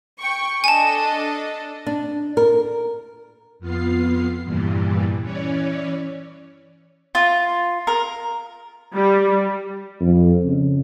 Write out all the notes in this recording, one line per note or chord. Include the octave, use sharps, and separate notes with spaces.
G5 C#6
D4 A4 D#5 G#5 A5
D4
A#4
F2 B3 F4 F5 C7
E2 G2 A#2 E3 G3
E3 C#4 C#5 D5
F4
A#4
G3
F2
C#3